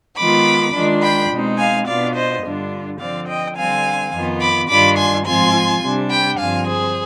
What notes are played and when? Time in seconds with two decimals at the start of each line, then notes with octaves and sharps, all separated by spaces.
0.17 D#3 G#3 B3 F4 B5 D6
0.74 D#3 G#3 D4 F4
1.02 G5 B5
1.31 B2 G#3 C4 D#4
1.58 F5 G#5
1.87 B2 B3 D4 F4 D5 F5
2.15 C5 D#5
2.43 G2 D3 G3 D4 F4
3.00 D3 F3 C4 D5 F5
3.27 D#5 G5
3.56 D3 G3 C4 F5 G#5
4.12 F2 D#3 B3 F4
4.41 B5 D6
4.69 G2 D#3 G3 D4 F4 B5 D6
4.97 G#5 C6
5.26 G#2 F3 C4 F4 G#5 C6
5.81 C3 G3 D4
6.10 G5 B5
6.39 G2 D3 F3 C4 F5 G#5
6.66 G#4 C5